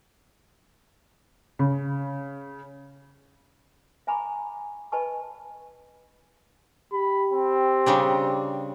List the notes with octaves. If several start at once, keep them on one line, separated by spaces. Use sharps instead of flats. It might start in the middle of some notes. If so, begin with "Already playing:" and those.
C#3
E5 G#5 A#5 B5 C#6 D6
B4 D#5 G#5 A5 B5 C#6
G4 B5
C4
C#3 G3 D4